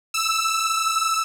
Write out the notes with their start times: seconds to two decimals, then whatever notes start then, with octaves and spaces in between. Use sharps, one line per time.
0.14 E6